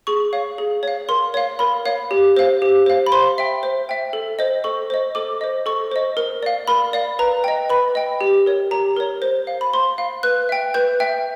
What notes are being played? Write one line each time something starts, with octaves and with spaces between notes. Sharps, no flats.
G#4 C#6
C#5 F5
G#4
C#5 F5
A#4 C6
C#5 F5
A#4 B5
C#5 F5
G4
C5 F5
G4
C5 F5
B5
C5 C6
E5 G5
C5
E5 G5
A4
C5 D#5
A4 C#6
C5 D#5
A4 D6
C5 D#5
A4 C#6
C5 D#5
A#4
D5 F5
A#4 B5
D5 F5
B4 A#5
D#5 G5
B4 B5
D#5 G5
G4
A#4 C#5
G4 A#5
A#4 C#5
C5
F5
B5
C5 C6
F5
B4 F#6
E5 G5
B4 G6
E5 G5